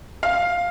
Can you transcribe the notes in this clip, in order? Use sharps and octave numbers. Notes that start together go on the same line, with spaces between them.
F5